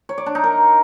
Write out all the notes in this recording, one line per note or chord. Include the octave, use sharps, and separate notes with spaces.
C#5
D5
D4
D#4
A#4